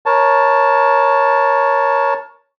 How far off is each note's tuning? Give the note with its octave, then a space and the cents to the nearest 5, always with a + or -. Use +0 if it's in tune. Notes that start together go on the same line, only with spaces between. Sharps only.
A#4 +20 C#5 +0 A5 +0